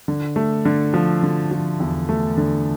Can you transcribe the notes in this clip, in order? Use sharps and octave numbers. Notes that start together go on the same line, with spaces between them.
D3
A3
D3
F3
D3
F3
E2
A3
D3